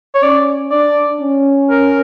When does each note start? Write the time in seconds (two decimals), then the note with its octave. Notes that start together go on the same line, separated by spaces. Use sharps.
0.15 C#5
0.23 C#4 D5
0.71 D4 D5
1.21 C#4
1.70 A#4